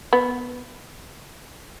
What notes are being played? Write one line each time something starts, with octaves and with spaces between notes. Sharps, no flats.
B3